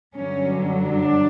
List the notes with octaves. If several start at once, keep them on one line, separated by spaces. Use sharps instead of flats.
G2 D3 F#3 C#4
D4